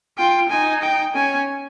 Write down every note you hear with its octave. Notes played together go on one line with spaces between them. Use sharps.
F4 G5
D#4 G#5
G5
C#4 G#5